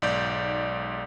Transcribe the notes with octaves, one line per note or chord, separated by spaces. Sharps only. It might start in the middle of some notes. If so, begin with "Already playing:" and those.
B1 G#2 D5 G6